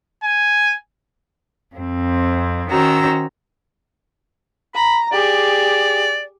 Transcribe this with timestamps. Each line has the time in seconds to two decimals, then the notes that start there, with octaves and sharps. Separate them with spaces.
0.23 G#5
1.76 F2 C4
2.70 D#3 C#4 F#4 C5 A#5 E6
4.75 A#5 B5
5.12 G4 G#4 D5